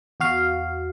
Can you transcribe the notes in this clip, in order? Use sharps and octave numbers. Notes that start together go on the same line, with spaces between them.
E2 F#4 F5